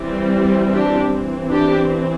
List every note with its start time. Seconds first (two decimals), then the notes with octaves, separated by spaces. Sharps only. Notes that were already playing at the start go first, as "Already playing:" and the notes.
Already playing: E3 G3 C4
0.74 D4 G4
1.12 E3 C4
1.51 D4 G4